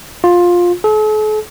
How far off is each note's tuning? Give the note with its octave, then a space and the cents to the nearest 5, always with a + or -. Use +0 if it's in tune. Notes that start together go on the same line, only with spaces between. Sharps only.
F4 +15
A4 -45